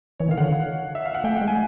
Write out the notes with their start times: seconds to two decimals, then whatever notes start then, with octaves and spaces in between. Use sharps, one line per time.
0.20 E3 C#5
0.29 D#3 F5
0.37 D3 F#5
0.95 E5
1.05 F5
1.14 F#5
1.24 A3 G5
1.42 G#3
1.48 G#5